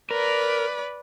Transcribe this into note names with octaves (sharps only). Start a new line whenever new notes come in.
A#4 B4 D5